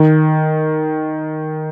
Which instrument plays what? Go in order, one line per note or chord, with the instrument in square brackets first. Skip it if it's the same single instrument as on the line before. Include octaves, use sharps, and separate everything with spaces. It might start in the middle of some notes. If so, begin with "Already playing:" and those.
Already playing: [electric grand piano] D#3